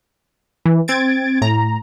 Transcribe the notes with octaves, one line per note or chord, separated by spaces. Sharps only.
E3
C4 G#6 A6 D7
A2 A#5